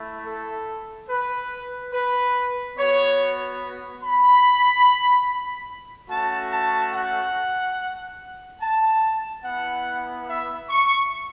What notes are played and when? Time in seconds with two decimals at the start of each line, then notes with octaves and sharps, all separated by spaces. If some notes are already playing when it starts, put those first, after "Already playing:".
Already playing: A3 E4
0.26 A4
1.09 B4
1.93 B4
2.77 B3 F#4 C#5
4.03 B5
6.10 A3 C#4 F#4 A5
6.53 A5
6.94 F#5
8.62 A5
9.44 B3 E4 F#5
10.28 E5
10.69 C#6